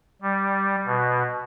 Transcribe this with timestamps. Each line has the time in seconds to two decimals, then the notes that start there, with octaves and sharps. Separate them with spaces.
0.22 G3
0.85 B2